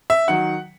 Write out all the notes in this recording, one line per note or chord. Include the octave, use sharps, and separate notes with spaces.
E5
D#3 F#3 F#5